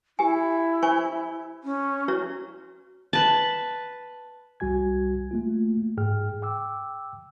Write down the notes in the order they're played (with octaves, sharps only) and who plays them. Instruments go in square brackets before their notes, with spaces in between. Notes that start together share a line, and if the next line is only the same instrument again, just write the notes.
[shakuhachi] E4 [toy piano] G4 G#5
[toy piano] C5 G#5 C#6
[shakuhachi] C#4
[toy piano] E4 F#4 C#5
[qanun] B4 A5
[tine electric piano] C2 G3 F#4 G#5 G#6
A3 A#3 F4
G#2 G#4 G5 F6
G5 D6 E6